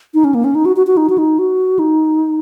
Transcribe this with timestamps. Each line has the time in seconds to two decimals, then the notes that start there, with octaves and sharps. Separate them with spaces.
0.14 D#4
0.24 C#4
0.34 A#3
0.44 C#4
0.55 D#4
0.65 F#4
0.76 F#4
0.87 F#4
0.97 D#4
1.10 F#4
1.18 D#4
1.39 F#4
1.79 D#4